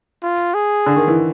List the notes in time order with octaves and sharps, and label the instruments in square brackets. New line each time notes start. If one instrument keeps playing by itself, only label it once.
[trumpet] F4
G#4
[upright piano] D3
D#3
E3